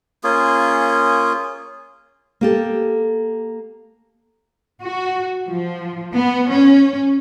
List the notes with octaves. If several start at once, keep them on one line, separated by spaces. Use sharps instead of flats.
A#3 C#4 F4 G#4
A#3 G4 A4
F#4
F3
B3
C#4